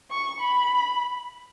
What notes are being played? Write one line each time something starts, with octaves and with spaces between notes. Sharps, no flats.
C#6
B5